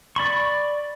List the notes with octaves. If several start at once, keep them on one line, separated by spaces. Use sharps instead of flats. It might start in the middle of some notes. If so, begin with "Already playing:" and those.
D5 B5 C#6